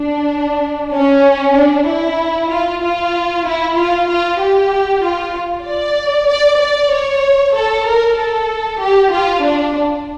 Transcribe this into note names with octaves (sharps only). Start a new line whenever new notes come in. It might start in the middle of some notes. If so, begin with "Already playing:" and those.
Already playing: D4
C#4
D4
E4
F4
F4
E4
F4
F4
G4
F4
D5
D5
D5
C#5
A4
A#4
A4
G4
F4
D4